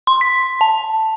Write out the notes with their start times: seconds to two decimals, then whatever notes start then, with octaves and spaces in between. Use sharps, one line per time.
0.07 C6
0.21 B6
0.61 A5